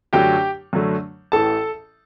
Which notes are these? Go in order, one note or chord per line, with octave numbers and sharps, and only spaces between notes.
F#2 D3 F#3 A3 G4 G5
F#2 D3 F#3 A3
A1 A2 E3 A4 A5